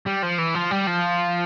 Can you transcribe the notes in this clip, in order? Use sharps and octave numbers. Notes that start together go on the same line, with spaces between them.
G3
F3
E3
F3
G3
F3